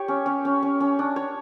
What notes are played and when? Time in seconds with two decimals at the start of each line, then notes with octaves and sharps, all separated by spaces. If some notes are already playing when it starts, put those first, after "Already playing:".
Already playing: G4 C#5
0.08 C#4
0.26 C#4
0.45 C#4
0.63 C#4
0.80 C#4
0.99 D4
1.16 C#5